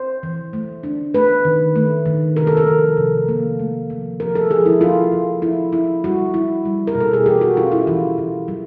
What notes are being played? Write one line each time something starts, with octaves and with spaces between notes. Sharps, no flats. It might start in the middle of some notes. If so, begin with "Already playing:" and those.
Already playing: C5
E3
A3
D4
A3 B4
D#3
A3
D#3
C3 A#4
A4
A#4
F3
C3
A#3
A3
F3
F3 A#4
A4
F3 G#4
E4
F3 F4
F3
E4
E4
G3 F#4
E4
G3
A#4
B2
A4
G#4
E3 G4
F#4
C#4 F4
E4
E3 F4
E3
F#3